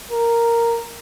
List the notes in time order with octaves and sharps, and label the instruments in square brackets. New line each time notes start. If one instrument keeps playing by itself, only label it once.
[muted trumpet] A#4